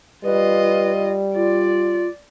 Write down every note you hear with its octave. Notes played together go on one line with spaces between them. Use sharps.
G3 F4 B4 D#5
F4 D5